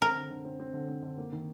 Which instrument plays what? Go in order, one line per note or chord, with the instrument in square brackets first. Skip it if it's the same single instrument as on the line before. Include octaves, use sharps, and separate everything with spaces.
[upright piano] C4 [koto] A#4
[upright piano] D3
D3
C4
C4
D3
C4
D3
A#3
D#3